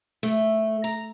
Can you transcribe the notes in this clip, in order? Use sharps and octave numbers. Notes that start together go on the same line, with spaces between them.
A3
A#5